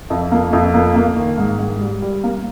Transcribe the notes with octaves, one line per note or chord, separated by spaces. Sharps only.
F2
A#3
F2
A#3
A#3
D#3
G#2
G#2
G3
G3
A#3